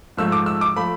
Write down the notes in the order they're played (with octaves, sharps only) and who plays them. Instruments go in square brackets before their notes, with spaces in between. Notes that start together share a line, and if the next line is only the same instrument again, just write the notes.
[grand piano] G#2 F3 A3 E6
D6
E6
D6
F3 A3 B5